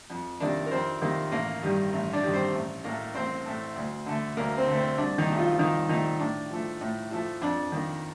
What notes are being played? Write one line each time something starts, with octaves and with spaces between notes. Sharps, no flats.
F2
C3 D#3 A#3 D4 D5
A#4
F2 C4 C5
C3 D#3 A#3
A1 A#3 A#4
G2 D#3 G3
A1
D4 D5
G2 D#3 G3
C4 C5
A1
A2 A3 A#3 A#4
A1 C4 C5
A2 A3
D2
D3 A3
D2 A#3 A#4
C4
D3 A3
C4
C2 D4
D#3 D#4
A#2 A3
F3 F4
F4
C2 D#3 D#4
A#2 D#3 A3 D#4
A2 D4
F3 A3
A2
F3 A3
F2 D4
D#3 A#3